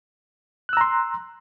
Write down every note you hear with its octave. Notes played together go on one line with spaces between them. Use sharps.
A#5 C6 E6 F#6